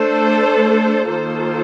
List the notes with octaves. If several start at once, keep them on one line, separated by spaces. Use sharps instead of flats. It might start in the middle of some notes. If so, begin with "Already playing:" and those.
Already playing: A3 D4 A4 C5
D#3 A#3 F4 A4 C5